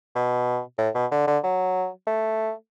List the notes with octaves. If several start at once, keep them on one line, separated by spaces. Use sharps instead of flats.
B2
A2
B2
D3
D3
F#3
A3